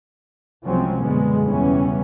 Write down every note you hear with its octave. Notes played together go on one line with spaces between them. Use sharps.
C2 F3 F#3 G#3 C4 C#4
F#2 B2 D3 G#3 B3
E2 C#3 E3 G3 B3 C#4